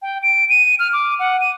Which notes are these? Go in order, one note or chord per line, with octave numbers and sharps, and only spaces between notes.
G5
D7
D#7
F6
D6
F#5
D#7